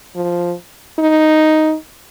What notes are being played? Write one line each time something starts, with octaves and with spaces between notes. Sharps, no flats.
F3
D#4